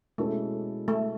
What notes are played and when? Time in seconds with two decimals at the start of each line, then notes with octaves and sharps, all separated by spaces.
0.18 B2 G#3 A3 C#4 E4 A4
0.88 A3